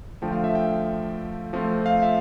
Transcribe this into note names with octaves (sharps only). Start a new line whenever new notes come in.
D3 F3 A3 G5
F5
E5
G5
F3 A3 C4 F4
F5
E5